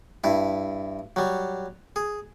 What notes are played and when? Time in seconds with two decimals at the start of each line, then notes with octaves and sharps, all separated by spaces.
0.24 G2 E4
1.16 F#3 G3
1.96 G#4